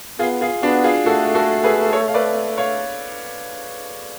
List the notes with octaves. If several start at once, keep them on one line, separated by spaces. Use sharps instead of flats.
B3 F4 G#4
F4 G#4
B3 D4 F#4
F4 G#4
A3 F#4 A4
F#4 A4
G#4 B4
A4 C#5
F5
B4 D5
C#5 F5